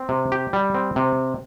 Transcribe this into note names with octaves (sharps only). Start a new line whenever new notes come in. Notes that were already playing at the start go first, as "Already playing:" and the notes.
Already playing: C4
C3
G4
G3
C4
C3